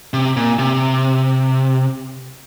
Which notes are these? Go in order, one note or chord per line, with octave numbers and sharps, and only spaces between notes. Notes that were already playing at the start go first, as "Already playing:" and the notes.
C3
A#2
C3